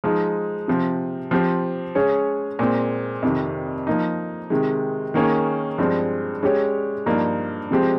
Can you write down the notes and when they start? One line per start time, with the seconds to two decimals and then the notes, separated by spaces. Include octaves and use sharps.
0.04 F3 G#3 D#4
0.68 C3 F3 C4
1.31 F3 C4 G4 C5
1.95 G#3 C#4 G#4 C#5
2.59 A#2 G#3 C4
3.22 F2 C3 D#3
3.87 F3 A#3 D#4
4.50 C3 D#3 G#3
5.14 D#3 A#3 C#4 G#4 C#5
5.78 G2 F3 G#3 C4
6.43 G#3 C#4 G4 C#5
7.06 G2 F3 A#3 D#4
7.71 C3 F3 G#3 C4 G4